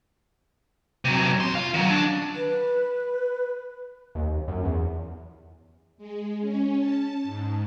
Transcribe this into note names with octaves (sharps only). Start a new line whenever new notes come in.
C3 F#3
D#2 C6
F4 F5
D#3 F#3
D4
B4
D#2
F#2
E2
G#3
C#4
A5
G#2